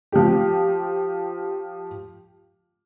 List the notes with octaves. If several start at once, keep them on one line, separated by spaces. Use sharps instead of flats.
F3 G4